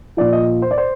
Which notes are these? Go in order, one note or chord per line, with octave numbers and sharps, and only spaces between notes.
A#2 F3 D5
D#5
C5
D5
C5